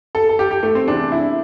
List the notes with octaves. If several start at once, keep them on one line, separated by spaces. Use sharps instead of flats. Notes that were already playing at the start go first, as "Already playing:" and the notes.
A4
A4
G4
G4
A3
C4
E2 C3 E3 D4
E4